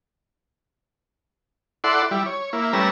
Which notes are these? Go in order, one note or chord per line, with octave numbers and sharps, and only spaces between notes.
E4 A4 D5 F#5 C6
G3 E4
C#5
A#3 E4
G3 A3 C#4 B4 A#5 E6